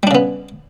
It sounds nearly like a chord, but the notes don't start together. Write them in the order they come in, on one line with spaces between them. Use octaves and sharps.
G3 D4 C#3 B3